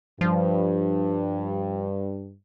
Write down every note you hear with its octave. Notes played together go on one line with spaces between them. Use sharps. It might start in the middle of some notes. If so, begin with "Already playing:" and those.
G2 F3